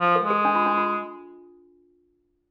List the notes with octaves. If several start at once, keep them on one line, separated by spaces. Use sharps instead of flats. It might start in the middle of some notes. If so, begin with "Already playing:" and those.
F3
A4
G#3
G#4
D4
F4
D4
F4